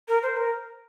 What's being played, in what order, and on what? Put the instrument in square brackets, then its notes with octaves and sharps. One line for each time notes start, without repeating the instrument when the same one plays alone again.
[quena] A#4
C5
A#4